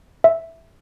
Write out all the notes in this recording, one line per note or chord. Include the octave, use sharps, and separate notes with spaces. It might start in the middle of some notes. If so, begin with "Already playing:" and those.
E5